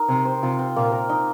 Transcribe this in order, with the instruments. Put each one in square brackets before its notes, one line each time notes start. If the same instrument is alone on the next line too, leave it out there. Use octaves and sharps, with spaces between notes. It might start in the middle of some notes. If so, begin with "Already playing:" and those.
Already playing: [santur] D#4 A#4
[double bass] C3 [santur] C4
[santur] C5
[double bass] C3 [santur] F4
[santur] C4
[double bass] A#2 [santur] A#3
[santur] A#4
D#4